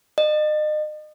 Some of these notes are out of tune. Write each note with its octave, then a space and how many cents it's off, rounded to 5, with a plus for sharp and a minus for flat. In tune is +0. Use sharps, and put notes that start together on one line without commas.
D#5 -35